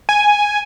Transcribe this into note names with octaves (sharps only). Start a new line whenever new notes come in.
G#5